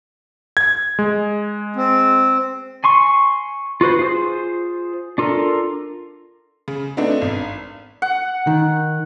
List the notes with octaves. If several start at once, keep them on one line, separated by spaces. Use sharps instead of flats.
G#6
G#3
C4
G#5 C6 C#6
F4 F#4 B4 C5
F4 G#4 C5
D4 F4 A4 A#4
C#3
A3 B3 C4 D4 D#4
G#1
F#5
D#3